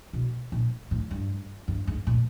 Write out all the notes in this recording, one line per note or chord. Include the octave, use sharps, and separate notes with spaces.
B2
A#2
A2
G2
G2
G#2
A#2